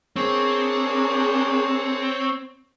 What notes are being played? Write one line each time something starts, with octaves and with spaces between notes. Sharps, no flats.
A#3 C4 D4 G#4 C#5